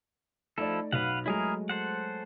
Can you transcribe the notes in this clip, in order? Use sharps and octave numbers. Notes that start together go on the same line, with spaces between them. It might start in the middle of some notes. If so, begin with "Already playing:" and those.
F3 A3 D#4 E4 A4 D5
B1 B4 F5 F#5
F#3 G#3 A3 E4 G#4 A#4
A4 C5 F#5